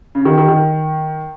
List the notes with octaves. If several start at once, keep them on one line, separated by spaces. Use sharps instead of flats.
C#3
D#3
D#3
D#3